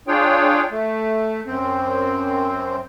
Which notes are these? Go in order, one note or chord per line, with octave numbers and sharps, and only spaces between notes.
D4 F4 G#4 C#5 G5
A3
F#2 C4